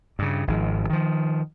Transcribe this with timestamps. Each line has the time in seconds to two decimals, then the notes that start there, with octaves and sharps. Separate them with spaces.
0.19 G2 C#3
0.47 G#1 G#2 F3
0.90 D#3 F3